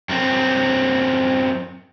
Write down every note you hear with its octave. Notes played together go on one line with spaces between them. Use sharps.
F#2 C4